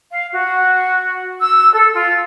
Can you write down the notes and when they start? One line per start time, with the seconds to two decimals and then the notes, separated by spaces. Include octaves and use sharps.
0.12 F5
0.32 F#4
1.41 E6
1.73 A4
1.94 F4